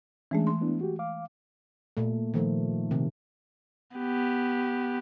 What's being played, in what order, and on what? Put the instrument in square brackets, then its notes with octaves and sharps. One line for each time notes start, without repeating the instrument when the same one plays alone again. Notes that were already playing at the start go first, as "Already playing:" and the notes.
[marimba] E3 G#3 A3 [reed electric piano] C#4 D4 G#4
[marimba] C6
[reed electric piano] B3 D4 E4
F#4 G4
F5 D6
[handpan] A#2 A3
D#3 F3 A3
C3 D#3
[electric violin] B3 G4